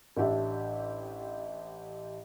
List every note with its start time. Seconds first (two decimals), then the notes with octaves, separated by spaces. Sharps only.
0.17 A1 D4 G4 E5